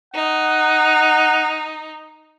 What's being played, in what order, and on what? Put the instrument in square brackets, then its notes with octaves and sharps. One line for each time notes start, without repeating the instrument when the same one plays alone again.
[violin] D#4 [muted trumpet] F#5